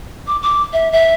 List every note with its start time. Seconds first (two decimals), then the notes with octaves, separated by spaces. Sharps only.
0.27 D6
0.42 D6
0.73 E5
0.92 E5